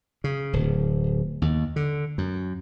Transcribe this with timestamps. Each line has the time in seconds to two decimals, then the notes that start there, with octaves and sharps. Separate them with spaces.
0.24 C#3
0.53 D1
1.42 D#2
1.76 D3
2.18 F#2